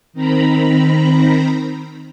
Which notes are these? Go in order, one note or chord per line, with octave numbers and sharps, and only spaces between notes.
D#3 C4 A#5 B5